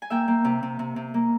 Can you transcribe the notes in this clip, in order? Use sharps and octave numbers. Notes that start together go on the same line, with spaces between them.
G#5
A#3 E5 G5
A#3
C3
C3
C3
C3
A#3